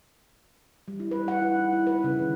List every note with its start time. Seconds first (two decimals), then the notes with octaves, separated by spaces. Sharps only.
0.88 G3
1.00 E4
1.11 B4
1.28 F#5
1.42 E4
1.56 D#4
1.73 E4
1.87 B4
2.04 C#3
2.20 D#3